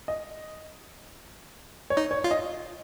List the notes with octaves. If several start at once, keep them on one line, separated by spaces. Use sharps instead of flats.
D#5
C#5
D#4
C#5
F4
D#5